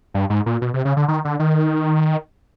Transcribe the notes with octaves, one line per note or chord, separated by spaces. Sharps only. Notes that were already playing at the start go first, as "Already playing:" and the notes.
G2
G#2
A#2
B2
C3
C#3
D3
D#3
D3
D#3